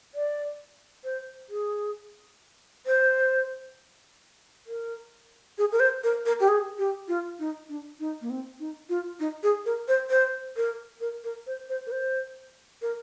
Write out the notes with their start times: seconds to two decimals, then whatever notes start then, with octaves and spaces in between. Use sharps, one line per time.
0.15 D5
1.04 C5
1.49 G#4
2.86 C5
4.67 A#4
5.58 G#4
5.72 A#4
5.80 C5
6.03 A#4
6.26 A#4
6.40 G4
6.48 G#4
6.78 G4
7.08 F4
7.39 D#4
7.69 D4
8.00 D#4
8.21 A#3
8.30 C4
8.60 D#4
8.89 F4
9.20 D#4
9.43 G#4
9.66 A#4
9.88 C5
10.10 C5
10.56 A#4
11.01 A#4
11.24 A#4
11.47 C5
11.69 C5
11.87 A#4
11.92 C5
12.82 A#4